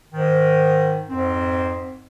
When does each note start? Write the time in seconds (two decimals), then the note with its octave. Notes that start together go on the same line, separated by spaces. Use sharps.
0.12 G#2 D#3
1.10 F2 G#2 C4